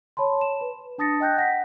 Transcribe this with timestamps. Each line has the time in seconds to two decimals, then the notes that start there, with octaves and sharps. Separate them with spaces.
0.17 C#5 A5 B5 C6
0.41 E7
0.61 B4
0.98 D4 A5 D#6 A6 A#6 C#7
1.20 D#5 G5 F#6 G6 A#6
1.37 F#5 A#6 B6